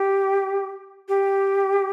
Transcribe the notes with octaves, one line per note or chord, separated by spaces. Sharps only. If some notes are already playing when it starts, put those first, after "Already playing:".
Already playing: G4
G4